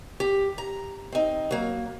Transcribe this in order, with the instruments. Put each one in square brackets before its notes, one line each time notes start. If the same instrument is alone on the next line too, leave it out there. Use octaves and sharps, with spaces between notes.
[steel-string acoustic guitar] G4
A#5
C4 D#4
F#3 A#3